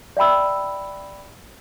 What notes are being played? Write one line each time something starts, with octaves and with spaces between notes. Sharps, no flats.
D5 E5 G5 B5 E6